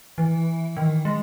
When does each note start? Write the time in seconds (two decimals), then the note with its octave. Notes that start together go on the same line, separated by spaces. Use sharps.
0.18 E3
0.77 D#3
1.05 G#3